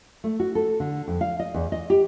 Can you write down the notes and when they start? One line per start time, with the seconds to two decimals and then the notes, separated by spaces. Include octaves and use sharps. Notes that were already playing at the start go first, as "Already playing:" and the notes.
0.24 A3
0.40 F#4
0.55 A4
0.80 D3
1.07 F2
1.21 F5
1.39 D#5
1.54 E2
1.72 D#5
1.90 G4